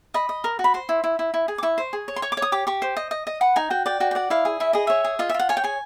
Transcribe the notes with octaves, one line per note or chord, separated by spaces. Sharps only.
D#5 B5
D#5
A#4
F#4
B5
C5 C6
E4
E4
E4
E4
G#4
D6
E4 C#6
C5
G#4
C#5
C6
C#5 C#6
D6
C#5
D#6
G4 D6
G4 C#6
C5
D#5
D#5
D#5
B4 F#5
D#4 G#5
F#4 G5
D5 G5
F#4 G5
G5
D5 F#5
E4 F5
G#4
E4 E5
G#4 D#5
C#5 E5
G#4
F4 D#5
E5
F4
F#5
C#5 G#5
G5
G#4 G#5